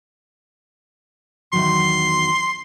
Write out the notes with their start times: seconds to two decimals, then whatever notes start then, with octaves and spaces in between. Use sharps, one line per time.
1.53 E2 D#3 F#3 C6